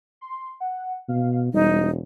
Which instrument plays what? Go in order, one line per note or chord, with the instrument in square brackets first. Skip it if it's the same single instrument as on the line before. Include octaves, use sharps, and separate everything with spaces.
[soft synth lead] C6
F#5
[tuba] B2 [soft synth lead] F5
[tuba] E1 [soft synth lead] G3 [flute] D#4